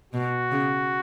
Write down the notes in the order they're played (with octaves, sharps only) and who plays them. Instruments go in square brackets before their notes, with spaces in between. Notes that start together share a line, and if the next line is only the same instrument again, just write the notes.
[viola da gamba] B2 [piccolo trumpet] F#4
[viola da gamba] C#3